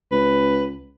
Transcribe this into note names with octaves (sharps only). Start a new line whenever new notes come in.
C#2 B4